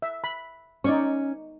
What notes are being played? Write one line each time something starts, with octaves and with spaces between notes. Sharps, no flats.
E5
B5
C#4 D#4 D5 C#6